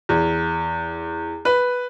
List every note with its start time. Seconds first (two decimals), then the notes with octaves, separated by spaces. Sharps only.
0.09 E2
1.45 B4